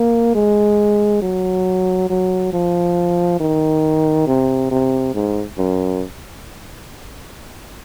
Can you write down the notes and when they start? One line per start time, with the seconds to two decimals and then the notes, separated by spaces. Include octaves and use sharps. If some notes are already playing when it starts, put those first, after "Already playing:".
Already playing: A#3
0.35 G#3
1.22 F#3
2.10 F#3
2.53 F3
3.40 D#3
4.28 C3
4.72 C3
5.15 G#2
5.58 F#2